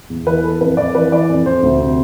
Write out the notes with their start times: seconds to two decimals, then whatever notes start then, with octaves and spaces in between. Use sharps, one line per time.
0.10 E2
0.27 E3 B4
0.43 E3 A4
0.61 F2 B4
0.77 F2 D5
0.95 E3 B4
1.12 E3 D5
1.29 F2
1.46 F2 C5
1.63 D2
1.80 C3